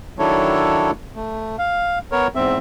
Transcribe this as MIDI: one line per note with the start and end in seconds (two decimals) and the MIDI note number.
0.19 0.91 51
0.19 0.91 54
0.19 0.91 62
0.19 0.91 64
0.19 0.91 69
0.19 0.91 73
1.15 1.56 57
1.59 1.99 77
2.12 2.27 59
2.12 2.27 70
2.12 2.27 73
2.35 2.58 40
2.35 2.58 44
2.35 2.58 60
2.35 2.58 76